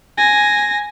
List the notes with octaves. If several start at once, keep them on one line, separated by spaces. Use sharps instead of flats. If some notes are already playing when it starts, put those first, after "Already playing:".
G#5 A#6